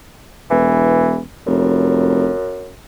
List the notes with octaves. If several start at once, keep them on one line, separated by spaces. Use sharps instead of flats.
E1 E3
F1 F#2